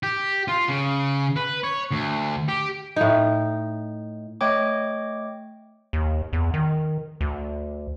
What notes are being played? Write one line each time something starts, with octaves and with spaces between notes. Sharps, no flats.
G4
F4
C#3
B4
C#5
D2
G4
A2 D#4
A3 C#5 D#5 G5 D6
D#2
E2
D#3
D2